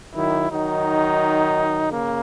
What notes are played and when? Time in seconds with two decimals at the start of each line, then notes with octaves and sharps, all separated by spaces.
0.15 D#3 F#3 E4
0.51 D#3 F#3 D#4
1.91 C#3 A#3